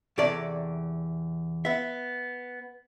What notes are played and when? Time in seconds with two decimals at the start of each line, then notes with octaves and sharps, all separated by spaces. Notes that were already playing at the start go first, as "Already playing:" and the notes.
0.18 E2 C3 A4 C#5 D5
1.65 B3 E5